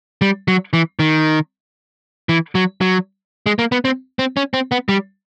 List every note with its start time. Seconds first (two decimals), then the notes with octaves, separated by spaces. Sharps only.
0.22 G3
0.48 F#3
0.73 E3
0.99 D#3
2.29 E3
2.55 F#3
2.81 F#3
3.46 G#3
3.59 A#3
3.72 B3
3.85 C4
4.19 C4
4.37 C#4
4.54 C4
4.72 B3
4.89 G3